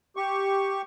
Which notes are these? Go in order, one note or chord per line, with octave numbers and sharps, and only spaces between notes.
G4 C#6